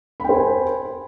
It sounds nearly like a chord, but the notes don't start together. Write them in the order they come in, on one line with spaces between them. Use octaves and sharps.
B5 G5 C5 G#5